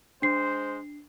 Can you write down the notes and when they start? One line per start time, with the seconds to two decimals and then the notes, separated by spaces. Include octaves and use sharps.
0.22 G#3 D4 C5 C7